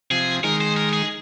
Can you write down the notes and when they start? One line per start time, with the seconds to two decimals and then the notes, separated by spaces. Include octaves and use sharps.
0.10 C3 F3 G#4
0.44 D#3 G#3 A#4
0.61 C5
0.77 A#4
0.93 G#4